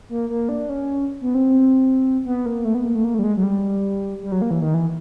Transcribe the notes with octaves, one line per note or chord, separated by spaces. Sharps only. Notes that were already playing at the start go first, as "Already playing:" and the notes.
A#3
A#3
D4
C#4
B3
C4
B3
A#3
A3
B3
A#3
A3
A#3
A3
G3
G#3
F#3
G3
G3
F#3
A#3
E3
D#3
E3